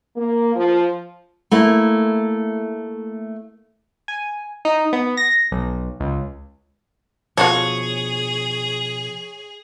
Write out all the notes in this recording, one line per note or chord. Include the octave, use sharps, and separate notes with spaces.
A#3
F3
A3 A#3 E4
G#5
D#4
B3
A#6
B1
C#2
B2 F3 F4 F#4 G#4 A4 C#5